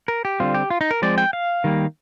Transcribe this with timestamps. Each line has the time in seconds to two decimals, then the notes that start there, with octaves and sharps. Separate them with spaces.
0.08 A#4
0.25 G4
0.40 D3 G3 C4 F4
0.54 G4
0.70 F4
0.81 D#4
0.91 A#4
1.02 F3 G#3 C4 D5
1.18 G5
1.33 F5
1.64 D#3 G3 A#3